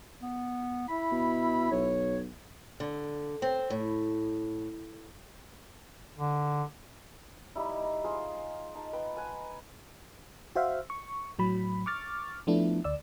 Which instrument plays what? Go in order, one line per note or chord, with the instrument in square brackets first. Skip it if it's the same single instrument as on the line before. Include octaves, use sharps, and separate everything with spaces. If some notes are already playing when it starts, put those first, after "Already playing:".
[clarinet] B3
[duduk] E4 [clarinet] B5
[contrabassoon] B2
[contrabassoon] B1 [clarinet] C#5
[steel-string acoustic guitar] D3
C4
A2
[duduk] D3
[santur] G3 D#4 E4
A#5
F4 G#4 C5
D#4 A5
B4 G5
F#5 G#5
[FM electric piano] F#4 C5 E5 F5
C#6
A2 F#3 B5
C#6 D6 F6 A6
F3 A3 B3 D4 E4
D2 D5 E6